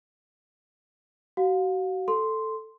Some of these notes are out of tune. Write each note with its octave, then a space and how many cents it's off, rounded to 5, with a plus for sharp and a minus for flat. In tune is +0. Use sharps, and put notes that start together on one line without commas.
F#4 +35 F5 +35
A4 +0 C6 +0